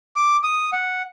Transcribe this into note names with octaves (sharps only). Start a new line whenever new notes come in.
D6
D#6
F#5